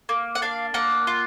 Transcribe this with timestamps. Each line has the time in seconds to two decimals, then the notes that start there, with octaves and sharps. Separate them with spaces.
0.09 A#3
0.35 F#5
0.42 D4 F5
0.74 A#3 F#5
1.07 F4